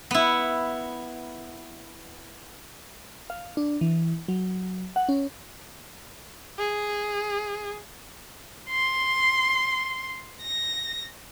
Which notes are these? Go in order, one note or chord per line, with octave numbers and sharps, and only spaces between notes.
B3 E4
F5
D4
E3
F#3
F#5
C#4
G#4
C6
A#6